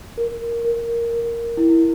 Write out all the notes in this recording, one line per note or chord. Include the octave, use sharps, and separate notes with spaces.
A#4
A#4
A#4
E4